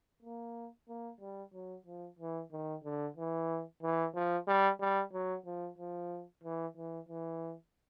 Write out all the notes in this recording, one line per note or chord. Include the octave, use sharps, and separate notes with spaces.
A#3
A#3
G3
F#3
F3
E3
D#3
D3
E3
E3
F3
G3
G3
F#3
F3
F3
E3
E3
E3